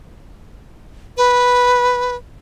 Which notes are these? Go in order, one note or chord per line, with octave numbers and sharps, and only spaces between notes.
B4